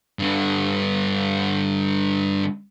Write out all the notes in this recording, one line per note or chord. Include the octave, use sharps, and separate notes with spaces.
G2 D3